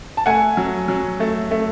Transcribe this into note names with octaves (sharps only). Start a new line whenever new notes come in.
A5
A3 F#5 G#5
F#3
F#3
A3
A3